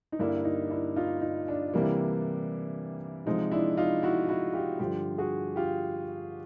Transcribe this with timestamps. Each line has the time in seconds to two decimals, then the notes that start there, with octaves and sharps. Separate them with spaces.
0.12 D#4
0.19 G2 D3 G3 A#3 D4 E4
0.45 D#4
0.70 D4 E4
0.96 D#4 F4
1.21 D#4
1.48 D4
1.74 C3 E3 G3 A#3
3.26 C3 F3 G#3 D#4
3.51 D4 E4
3.77 D#4 F4
4.03 E4 F#4
4.28 E4 F#4
4.53 F4 G4
4.79 G2 D3 F3 F4 G4
5.18 F#4 G#4
5.56 F4 G4